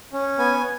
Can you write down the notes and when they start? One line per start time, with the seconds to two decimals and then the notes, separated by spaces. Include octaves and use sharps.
0.13 C#4
0.38 B3 G#5